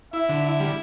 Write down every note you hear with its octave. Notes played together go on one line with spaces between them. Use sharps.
E4 E5
D3
E4
G3